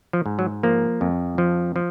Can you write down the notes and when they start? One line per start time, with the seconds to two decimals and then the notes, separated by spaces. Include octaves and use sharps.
0.13 F3
0.26 G#2
0.39 F#3
0.63 F3 A#3
1.01 F2
1.38 F3
1.76 F3